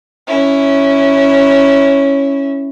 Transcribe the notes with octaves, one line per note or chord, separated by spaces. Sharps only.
C#4 E4